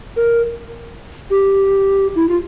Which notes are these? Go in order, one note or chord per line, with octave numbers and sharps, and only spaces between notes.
A#4
G4
E4
F4